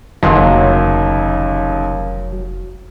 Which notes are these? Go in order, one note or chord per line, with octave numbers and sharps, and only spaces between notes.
F1 D#2 C#3 F#3 E4 C6